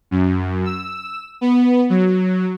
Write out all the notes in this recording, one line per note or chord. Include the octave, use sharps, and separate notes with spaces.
F#2
E6
B3
F#3